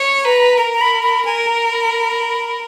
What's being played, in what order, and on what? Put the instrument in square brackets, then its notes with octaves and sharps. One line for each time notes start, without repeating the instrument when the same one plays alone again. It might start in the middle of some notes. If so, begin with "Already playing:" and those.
Already playing: [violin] C#5
[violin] B4 [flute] A#5
[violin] A#4 [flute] A#5
[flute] A#5
B5
B5
[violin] A#4 [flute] G#5
[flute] A#5
B5